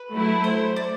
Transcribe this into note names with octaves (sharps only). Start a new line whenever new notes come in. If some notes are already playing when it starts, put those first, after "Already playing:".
Already playing: B4
F#3 A3 E4
C5
D5